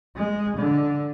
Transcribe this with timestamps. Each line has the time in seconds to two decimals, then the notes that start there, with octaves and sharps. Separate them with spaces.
0.16 G#3
0.57 D3